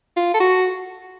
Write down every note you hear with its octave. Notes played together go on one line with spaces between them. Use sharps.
F4
A4
F#4